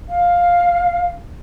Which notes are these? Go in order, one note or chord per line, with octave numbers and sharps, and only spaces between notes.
F5